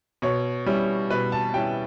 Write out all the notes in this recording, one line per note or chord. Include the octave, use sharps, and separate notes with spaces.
B2 C#5
G3 C#4 E4
B2 B4
A5
G3 C#4 E4 G5